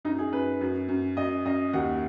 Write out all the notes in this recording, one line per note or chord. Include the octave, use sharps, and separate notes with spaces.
F#2 D#4
G#4
F#2 B4
F#2
F#2
F#2 D#5
F#2 D#5
D#2 F#5